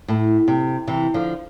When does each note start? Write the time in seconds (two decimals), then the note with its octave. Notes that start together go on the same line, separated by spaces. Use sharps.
0.08 A2
0.48 C3
0.87 C3 E3
1.14 D3 F3